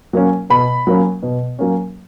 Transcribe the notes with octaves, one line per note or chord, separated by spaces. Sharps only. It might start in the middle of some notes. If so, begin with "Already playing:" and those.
F#3 A#3 C#4
B2 B5
F#3 A#3 C#4
B2
F#3 A#3 C#4